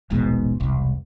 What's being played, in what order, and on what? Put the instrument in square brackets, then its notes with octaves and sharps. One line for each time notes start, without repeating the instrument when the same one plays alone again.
[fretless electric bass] D#1 A1 G#2 B2
E1 C2